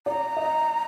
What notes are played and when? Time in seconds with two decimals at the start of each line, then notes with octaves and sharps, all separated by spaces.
0.06 D5 A#5
0.37 D#5